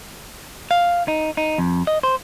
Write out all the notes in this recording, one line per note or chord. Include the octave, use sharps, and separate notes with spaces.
F5
D#4
D#4
F2
D#5
C5